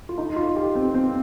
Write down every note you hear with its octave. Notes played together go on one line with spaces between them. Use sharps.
F4
D#4
F4
G4
C4
C4